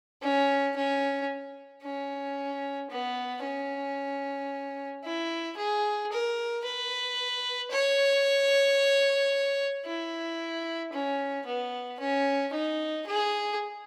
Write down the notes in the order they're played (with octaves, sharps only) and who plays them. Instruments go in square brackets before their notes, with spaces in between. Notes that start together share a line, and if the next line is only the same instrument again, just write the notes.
[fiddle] C#4
C#4
C#4
B3
C#4
E4
G#4
A#4
B4
C#5
E4
C#4
B3
C#4
D#4
G#4